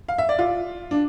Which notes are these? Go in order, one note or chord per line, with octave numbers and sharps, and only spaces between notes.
F5
E5
D5
F4
D4